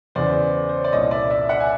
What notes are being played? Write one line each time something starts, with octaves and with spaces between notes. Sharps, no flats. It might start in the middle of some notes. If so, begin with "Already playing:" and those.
E2 C#3 E3 C5 D5
C5
C#5
D5
C2 A#2 C#5 D#5
D5 E5
D5 E5
E5 F#5
G#5